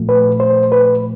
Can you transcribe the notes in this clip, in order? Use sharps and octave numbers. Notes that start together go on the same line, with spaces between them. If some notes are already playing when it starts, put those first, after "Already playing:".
Already playing: A#2 F3 A3
B4
C5
B4